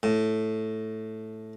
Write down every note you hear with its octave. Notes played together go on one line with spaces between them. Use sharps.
A2